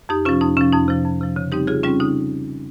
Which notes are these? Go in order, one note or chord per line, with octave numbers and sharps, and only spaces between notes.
F2 D#4 G4
C3 F3 C#4 F4
F2 D#4
C3 F3 C#4
F2 D#4
C3 F3
F2
C3 F3
C#3
G3 C4 D#4 G4
C#3 F4 G#4
G3 C4 C#4 F4
C#3 D#4